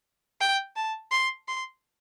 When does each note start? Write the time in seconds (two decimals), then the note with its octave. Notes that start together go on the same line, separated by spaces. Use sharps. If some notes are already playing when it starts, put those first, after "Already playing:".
0.41 G5
0.76 A5
1.12 C6
1.48 C6